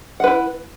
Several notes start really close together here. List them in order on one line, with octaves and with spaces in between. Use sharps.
F#5 B4 E4